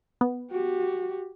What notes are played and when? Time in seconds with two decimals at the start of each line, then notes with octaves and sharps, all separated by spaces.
0.21 B3
0.51 F#4 G4